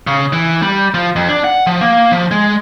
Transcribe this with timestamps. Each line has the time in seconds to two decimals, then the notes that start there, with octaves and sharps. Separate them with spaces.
0.07 C#3
0.33 E3
0.62 G3
0.94 F3
1.16 F2
1.29 D4
1.44 F#5
1.67 F3
1.81 A#3
2.12 F3
2.31 G#3